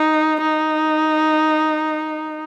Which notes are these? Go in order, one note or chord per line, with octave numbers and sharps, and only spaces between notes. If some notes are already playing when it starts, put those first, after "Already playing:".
Already playing: D#4
D#4